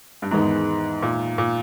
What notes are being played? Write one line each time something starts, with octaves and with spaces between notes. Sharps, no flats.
G2
E2 G#2 D#3 G#3 B3 D#4
A#2
A#2